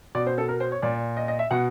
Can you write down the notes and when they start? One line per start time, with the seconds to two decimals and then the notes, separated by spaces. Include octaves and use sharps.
0.15 B2 D5
0.27 C5
0.38 A4
0.49 A#4
0.60 C5
0.72 C#5
0.82 A#2 D5
1.17 D#5
1.28 D#5
1.39 E5
1.51 B2 F#5